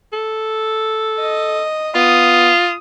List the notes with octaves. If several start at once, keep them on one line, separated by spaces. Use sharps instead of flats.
A4
D#5
B3 F4 D#6